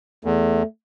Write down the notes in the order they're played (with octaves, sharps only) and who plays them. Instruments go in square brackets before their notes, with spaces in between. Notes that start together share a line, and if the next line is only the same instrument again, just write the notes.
[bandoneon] E2 [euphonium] A3